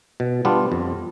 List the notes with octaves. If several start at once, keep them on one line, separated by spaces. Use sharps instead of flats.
B2
G3 B3 D4 F4
F2